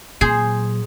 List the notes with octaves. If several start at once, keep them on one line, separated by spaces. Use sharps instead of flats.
A#2 F#3 G#4 C5